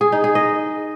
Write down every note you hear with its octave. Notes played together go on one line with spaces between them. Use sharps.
G#4
D#4
G#4
D#5